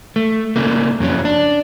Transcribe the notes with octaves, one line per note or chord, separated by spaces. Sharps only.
A3
C#3 A3 A#3
F2 C#3 F#3 C#4
D4